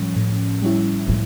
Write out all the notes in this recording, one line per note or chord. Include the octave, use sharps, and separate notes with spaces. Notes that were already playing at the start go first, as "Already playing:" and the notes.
Already playing: A2 F3 G3 C#4
A2
G3 C#4 E4
A2 F3